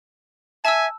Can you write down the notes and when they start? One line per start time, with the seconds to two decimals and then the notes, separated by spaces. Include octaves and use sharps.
0.65 E5 G#5 A5 E6